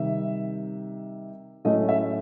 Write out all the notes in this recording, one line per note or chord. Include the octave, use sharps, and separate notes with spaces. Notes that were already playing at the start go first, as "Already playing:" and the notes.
Already playing: C3 D#3 G3 E5
A2 F#3 A3 C#4 D#5
E5